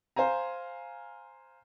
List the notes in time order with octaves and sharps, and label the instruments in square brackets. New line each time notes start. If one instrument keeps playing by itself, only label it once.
[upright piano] C5 F5 G#5 A#5